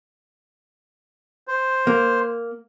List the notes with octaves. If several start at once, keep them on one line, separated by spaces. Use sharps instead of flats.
C5
A#3